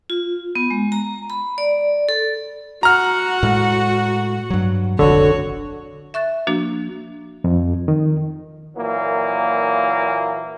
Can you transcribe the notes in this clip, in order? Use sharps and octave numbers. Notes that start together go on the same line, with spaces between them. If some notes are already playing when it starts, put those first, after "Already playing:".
F4
B3
G#3
A#5
B5
D5
A4
F#4 F#5 A#5 F6
A2 G#3
G2 F#3
F1 A#1 F2 D3 F#4 C#5
E5 C#6 F#6 A6
F3 A#3 D4 F#4
F2
D#3
A#2 E3 F#3 A#3